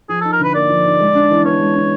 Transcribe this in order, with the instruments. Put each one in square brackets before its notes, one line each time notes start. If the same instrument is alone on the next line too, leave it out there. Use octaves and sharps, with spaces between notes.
[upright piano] F3 [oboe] G#4
[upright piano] D#4 [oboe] A4
[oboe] A#4
[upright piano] D3 [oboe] B4
[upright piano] A#3 [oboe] D5
[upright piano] F3
D#4
G#3
D4
E3
[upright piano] B3 [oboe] C#5
[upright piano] G#3
D4